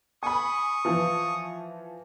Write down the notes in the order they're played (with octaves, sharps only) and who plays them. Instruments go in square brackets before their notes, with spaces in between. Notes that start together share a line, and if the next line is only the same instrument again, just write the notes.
[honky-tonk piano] G#5 B5 [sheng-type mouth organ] C#6 D#6
[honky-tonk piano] E3 F3